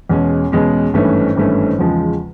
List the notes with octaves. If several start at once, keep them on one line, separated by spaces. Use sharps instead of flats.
E2 B2 G#3 C#4
E2 B2 G#3 C#4
G#1 G2 E3 A3 C#4
G#1 G2 E3 A3 C#4
E2 C#3 F3 G#3